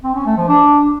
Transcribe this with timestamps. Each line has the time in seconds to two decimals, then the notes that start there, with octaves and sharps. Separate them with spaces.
0.04 C4
0.15 C#4
0.26 A3
0.37 F3
0.48 D4